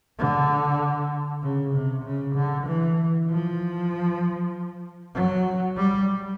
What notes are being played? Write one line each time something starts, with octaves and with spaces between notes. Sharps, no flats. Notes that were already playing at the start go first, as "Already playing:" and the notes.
D3
C#3
C3
C#3
D3
E3
F3
F#3
G3